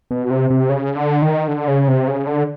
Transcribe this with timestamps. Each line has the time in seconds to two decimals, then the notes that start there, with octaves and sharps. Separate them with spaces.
0.11 B2
0.30 C3
0.50 C3
0.69 C#3
0.96 D3
1.22 D#3
1.48 D3
1.68 C#3
1.88 C3
2.07 C#3
2.27 D3